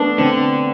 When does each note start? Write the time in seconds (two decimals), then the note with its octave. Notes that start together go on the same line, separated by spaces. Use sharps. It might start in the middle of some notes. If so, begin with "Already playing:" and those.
Already playing: A3 B3 D4
0.18 D3 C4